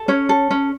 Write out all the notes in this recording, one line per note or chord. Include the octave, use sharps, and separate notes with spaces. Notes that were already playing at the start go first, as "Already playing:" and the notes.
Already playing: A4
C#4 C#5
A4
C#4